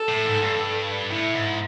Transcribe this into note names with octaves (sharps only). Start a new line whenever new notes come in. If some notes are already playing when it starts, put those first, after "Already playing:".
Already playing: A4
A2
G#2
G2
A2 E4
G#2